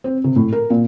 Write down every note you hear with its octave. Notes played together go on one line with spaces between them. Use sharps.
C4
C3
A2
A#4
A#2